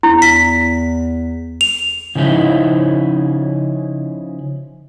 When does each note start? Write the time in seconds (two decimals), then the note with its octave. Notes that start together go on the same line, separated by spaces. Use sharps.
0.03 E2 E4
0.22 B6
1.61 F7
2.15 C#3 F3 C#4 D#4 E4